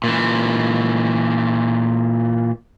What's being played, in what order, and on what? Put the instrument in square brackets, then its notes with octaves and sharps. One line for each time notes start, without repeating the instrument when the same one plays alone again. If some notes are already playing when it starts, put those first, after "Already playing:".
[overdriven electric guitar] A#2 E3